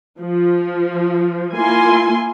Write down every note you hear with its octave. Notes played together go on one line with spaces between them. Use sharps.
F3
A#3 E4 F4 G#5 C6